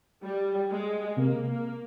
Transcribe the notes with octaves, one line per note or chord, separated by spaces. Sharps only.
G3
G#3
C3 A#3
A#3